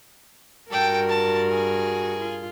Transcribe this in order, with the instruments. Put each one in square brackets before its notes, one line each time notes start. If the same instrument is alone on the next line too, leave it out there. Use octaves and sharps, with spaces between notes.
[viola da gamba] G2 F#4 A#4 [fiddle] A4 G5
[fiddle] A5
G#4
[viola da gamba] F4